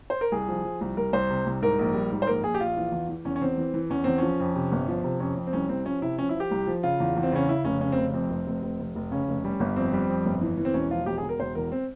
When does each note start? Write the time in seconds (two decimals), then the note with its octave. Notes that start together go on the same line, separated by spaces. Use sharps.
0.10 C5
0.21 A#4
0.32 C2 G#4
0.48 F3
0.65 F3
0.81 C2
0.97 C2 A#4
1.13 C2 C5
1.30 C3
1.46 C2
1.62 G#2 A#4
1.79 A#1
1.94 G3
2.12 G#2
2.22 C5
2.27 A#1 A#4
2.43 A#1 G#4
2.54 G4
2.60 A#1 F4
2.77 E3
2.92 E2
3.09 E3
3.25 E2 C#4
3.36 C#4
3.41 E2 C4
3.57 E3
3.74 E3
3.90 E2 C#4
4.04 E2 C4
4.18 F3 C#4
4.40 F2
4.55 C3
4.72 G1
4.88 F3
5.04 C3
5.20 F2 C#4
5.37 F2
5.47 C4
5.53 C2 C#4
5.69 C2 C4
5.86 F3 C#4
6.02 C3 E4
6.18 F3 C#4
6.29 E4
6.35 F3
6.40 G4
6.51 C2
6.67 F3
6.83 C#3 F4
7.00 E2
7.16 E2
7.23 C4
7.32 C#3 C#4
7.48 C#3 E4
7.65 F1 C#4
7.81 C#3 C#4
7.92 C4
7.97 F1
8.14 F2 C4
8.30 F1
8.47 F1
8.62 F1
8.79 F1
8.96 F1
9.11 C#3 C#4
9.28 F1
9.44 G3
9.60 G1
9.76 F2 C4
9.93 G3
10.09 F2
10.26 G1
10.41 E3
10.57 E3
10.65 C4
10.74 E1 C#4
10.90 F3 F4
11.06 E1 G4
11.18 G#4
11.23 E1
11.29 A#4
11.40 E1 C5
11.55 E2 A#4
11.72 C4